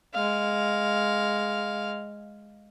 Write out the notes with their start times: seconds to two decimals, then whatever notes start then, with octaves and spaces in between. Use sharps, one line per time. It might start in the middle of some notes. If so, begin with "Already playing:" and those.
0.14 G#3 F5